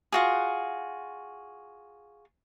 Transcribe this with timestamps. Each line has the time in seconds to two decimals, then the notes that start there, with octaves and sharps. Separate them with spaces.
0.12 F4 F#4 G#4